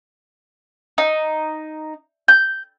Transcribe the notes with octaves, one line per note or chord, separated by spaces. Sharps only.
D#4
G6